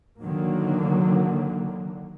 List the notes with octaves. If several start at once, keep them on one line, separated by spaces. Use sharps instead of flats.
D3 D#3 F#3 A#3